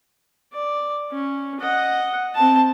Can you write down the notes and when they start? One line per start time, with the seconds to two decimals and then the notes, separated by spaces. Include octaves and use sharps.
0.53 D5
1.12 C#4
1.61 D#5 F#5
2.35 C4 A5